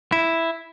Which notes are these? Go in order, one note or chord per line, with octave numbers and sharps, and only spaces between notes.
E4